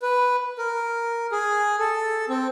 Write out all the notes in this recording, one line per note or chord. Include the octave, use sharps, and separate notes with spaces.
B4
A#4
G#4
A4
C4